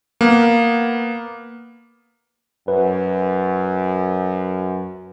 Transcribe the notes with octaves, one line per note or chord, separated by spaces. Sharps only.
A#3 B3
F#2 B4